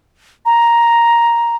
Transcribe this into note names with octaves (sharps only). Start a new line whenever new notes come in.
A#5